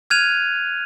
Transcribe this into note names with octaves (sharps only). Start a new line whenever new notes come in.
F6 F#6 G#6 D#7 F7